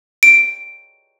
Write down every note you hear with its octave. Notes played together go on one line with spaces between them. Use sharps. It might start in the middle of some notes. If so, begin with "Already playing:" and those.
D7